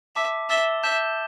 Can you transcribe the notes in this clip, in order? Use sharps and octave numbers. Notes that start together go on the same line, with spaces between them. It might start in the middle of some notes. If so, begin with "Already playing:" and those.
E5 A5 D6 B6
E5 E6 A6 E7 G7
E5 A5 G6 E7 G7